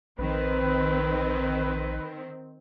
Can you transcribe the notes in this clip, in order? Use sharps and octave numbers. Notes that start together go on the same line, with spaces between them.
A#1 D#3 C4 B4